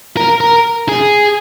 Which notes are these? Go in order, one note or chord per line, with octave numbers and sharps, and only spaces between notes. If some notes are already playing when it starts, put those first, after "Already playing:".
A#4
A#4
G#4